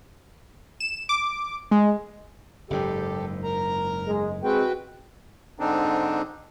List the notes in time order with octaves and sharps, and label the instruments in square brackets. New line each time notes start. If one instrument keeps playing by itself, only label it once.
[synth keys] E7
D6
G#3
[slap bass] F#1 G#2 [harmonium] G4 A4
[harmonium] A#4 A#5
[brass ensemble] G#3
[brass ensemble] G#3 C4 G#4 [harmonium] F#4 B4 G5
[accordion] G#2 D3 C4 D4 D#4